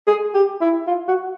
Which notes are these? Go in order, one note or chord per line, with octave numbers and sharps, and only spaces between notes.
G#4
G4
E4
F4
F#4